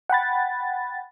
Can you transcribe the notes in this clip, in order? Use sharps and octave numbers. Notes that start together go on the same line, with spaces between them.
F#5 G5 B5 A6